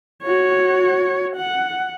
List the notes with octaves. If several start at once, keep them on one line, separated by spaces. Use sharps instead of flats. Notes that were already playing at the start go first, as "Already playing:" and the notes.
F#4 C#5
F#5